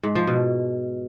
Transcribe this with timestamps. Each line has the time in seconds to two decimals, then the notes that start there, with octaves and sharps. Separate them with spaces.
0.03 G#2
0.15 F3
0.27 B2